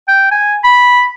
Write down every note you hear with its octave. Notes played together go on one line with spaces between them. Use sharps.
G5
G#5
B5